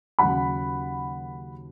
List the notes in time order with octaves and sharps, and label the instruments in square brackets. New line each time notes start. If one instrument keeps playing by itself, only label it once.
[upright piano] D#2 C#3 F#3 F#5 B5